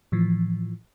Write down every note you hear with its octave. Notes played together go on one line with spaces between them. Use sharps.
A2 E3 F3